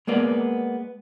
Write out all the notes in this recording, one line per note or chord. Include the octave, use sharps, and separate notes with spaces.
G#3 A#3 B3 D5